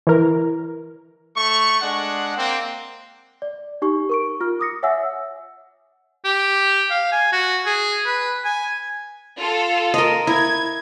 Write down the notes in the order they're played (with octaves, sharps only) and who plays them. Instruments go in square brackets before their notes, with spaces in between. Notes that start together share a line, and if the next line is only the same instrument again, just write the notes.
[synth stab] E3 A#4
[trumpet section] A3 C#6
G#3 D4 F#5
A#3 C4
[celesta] D5
D#4 G4 C#6
A#4 C#6 D7
F4 F6
D6 D#6 A#6 C#7
C#5 E5 F#5 G#5 E6
[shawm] G4
F5
G#5
F#4
G#4
B4
G#5
[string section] F4 A4
[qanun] A#4 D#5
[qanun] E4 [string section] G#6